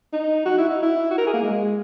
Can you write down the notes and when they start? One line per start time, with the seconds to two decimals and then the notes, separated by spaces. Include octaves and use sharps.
0.13 D#4
0.46 F#4
0.58 E4
0.70 D#4
0.83 E4
1.11 F#4
1.18 A#4
1.27 G#4
1.34 A#3
1.43 G#3